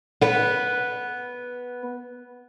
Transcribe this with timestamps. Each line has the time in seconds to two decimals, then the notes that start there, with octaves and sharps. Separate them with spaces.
0.21 B3 B4